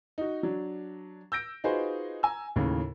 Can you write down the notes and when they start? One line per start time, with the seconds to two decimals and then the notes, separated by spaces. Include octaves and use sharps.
0.18 D#4 F#4
0.43 F#3 D4
1.32 E6 G6 A#6 D7
1.64 D#4 F4 F#4 G#4 B4 C5
2.23 G#5 A#5 E6
2.56 D#2 A2 C#3